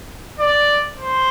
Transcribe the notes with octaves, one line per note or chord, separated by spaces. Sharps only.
D5
C5